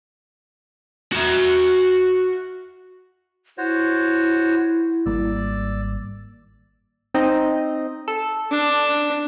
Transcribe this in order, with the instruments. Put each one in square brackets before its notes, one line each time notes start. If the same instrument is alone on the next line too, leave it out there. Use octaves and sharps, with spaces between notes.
[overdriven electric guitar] F#4 E5
[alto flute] E4 [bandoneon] F#4 C5 C#5
[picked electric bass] G#1 G3 A#3 [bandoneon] D5 E6
[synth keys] C4 D#4 D#5
A4
[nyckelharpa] D4